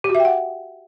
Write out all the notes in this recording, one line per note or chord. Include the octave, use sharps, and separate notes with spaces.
G4
F#4
E5
G5
F#5